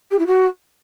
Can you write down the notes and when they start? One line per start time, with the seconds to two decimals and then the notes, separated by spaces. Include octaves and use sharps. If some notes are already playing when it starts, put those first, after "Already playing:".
0.11 G4
0.19 E4
0.26 F#4